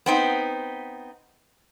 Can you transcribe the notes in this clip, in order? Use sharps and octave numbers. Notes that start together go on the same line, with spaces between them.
B3 C4 D#4